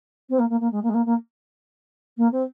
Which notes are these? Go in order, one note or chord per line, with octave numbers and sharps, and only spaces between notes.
C4
A#3
A#3
A#3
G#3
A#3
G#3
A#3
A#3
A#3
C4